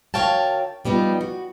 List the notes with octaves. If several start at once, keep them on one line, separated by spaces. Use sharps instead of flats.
D2 A#4 C#5 F5 G5 A5
F3 G3 B3 D#4
F#4